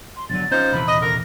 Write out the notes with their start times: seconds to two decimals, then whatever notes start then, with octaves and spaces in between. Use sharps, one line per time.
0.17 C6
0.30 G1 D3 F#3 A6
0.51 F3 C#4 D#4 C5
0.72 D#1 C3 E3 B5
0.87 D#5
1.02 D3 A#4 A#6